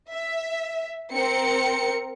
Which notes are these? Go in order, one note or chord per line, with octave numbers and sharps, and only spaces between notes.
E5
C4 A#4 C#7